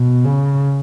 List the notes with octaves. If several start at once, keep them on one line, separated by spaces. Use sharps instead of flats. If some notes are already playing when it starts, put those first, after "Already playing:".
Already playing: B2
C#3